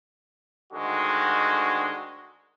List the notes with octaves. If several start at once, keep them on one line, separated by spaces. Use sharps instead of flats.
D2 D3 D#3 G#3 F#4